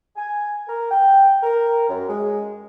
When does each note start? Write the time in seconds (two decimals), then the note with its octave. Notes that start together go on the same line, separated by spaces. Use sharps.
0.16 G#5
0.68 A#4
0.91 G5
1.43 A#4
1.89 F#2
2.08 G#3